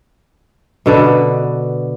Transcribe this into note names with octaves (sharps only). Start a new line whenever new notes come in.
B2 D3 B4